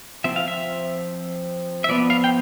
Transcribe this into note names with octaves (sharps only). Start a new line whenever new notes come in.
F3 C4 E5
F5
E5
E5
F3 B3 D5
F5
G5